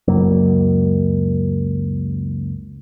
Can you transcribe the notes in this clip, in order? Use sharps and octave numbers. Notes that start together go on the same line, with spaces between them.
C#2 F#2 F#3 A#3